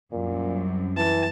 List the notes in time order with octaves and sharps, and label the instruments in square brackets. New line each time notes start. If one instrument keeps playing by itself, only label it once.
[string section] C2 F#2 [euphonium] A#2
[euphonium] E3 [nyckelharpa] A5